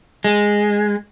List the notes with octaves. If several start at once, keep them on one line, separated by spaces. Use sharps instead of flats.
G#3